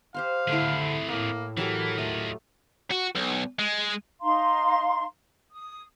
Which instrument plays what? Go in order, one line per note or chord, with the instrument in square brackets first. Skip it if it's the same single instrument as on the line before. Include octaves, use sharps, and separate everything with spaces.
[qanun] G4 C5 C6 [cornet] F5
[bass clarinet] D3 [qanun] A3 E4 [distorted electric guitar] C4 G#4
[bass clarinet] A2 [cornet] A#3 [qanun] E5
[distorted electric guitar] E3 [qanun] F#3 G4 A4 [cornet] A#4
[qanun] A3 [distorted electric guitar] F4 D#5
[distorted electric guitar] F#4
B1
G#3
[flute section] D#4 F5 A#5 C6
D#6